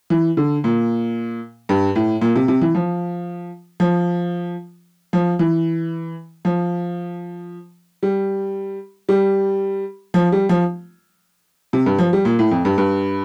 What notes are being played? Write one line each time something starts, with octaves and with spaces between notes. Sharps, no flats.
E3
D3
A#2
G2
A2
A#2
C3
C3
E3
F3
F3
F3
E3
F3
G3
G3
F3
G3
F3
C3
G2
F3
G3
A#2
A2
F2
G2
G2